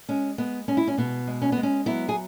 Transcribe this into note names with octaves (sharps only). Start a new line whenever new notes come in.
G#3 C#4
G#3 B3
G#3 C#4
E4
C#4
B2 B3
G#3
C#4
G#3 B3
C#4
F#3 B3 E4
G#4